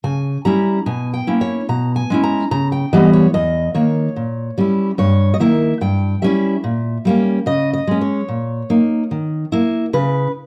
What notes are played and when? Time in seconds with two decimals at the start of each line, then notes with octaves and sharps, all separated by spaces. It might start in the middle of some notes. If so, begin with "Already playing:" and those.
0.04 C#3 G#5
0.45 G3 C#4 E4 A#5
0.86 B2 G#5
1.14 G5
1.27 A#3 C#4 E4
1.41 C#5
1.69 B2 A#5
1.96 G#5
2.10 G#3 C#4 E4
2.24 A#5
2.51 C#3 A#5
2.72 G5
2.93 E3 G3 B3 D#5
3.13 C#5
3.34 E2 D#5
3.75 D#3 A#3 C#5
4.16 A#2
4.58 G3 C#4 E4
4.98 G2 C#5
5.34 D#5
5.40 D#3 A#3 E4 E5
5.81 G2 G5
6.22 G3 C#4 E4 E5
6.64 A#2
7.05 G3 A#3 C#4
7.46 C#3 D#5
7.73 D#5
7.87 G#3 C#4
8.01 C#5
8.29 A#2
8.70 A#3 D#4
9.11 D#3
9.52 A#3 E4
9.93 C#3 B4